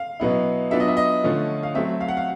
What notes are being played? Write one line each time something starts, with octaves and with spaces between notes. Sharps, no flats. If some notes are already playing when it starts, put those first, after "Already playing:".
Already playing: F5
B2 F#3 B3 E4
F#3 B3 D4 F4 E5
D#5
E5
D#5
D3 F3 A3 C#4 F4
F5
F#3 A3 C4 E5
F5
F#5
F5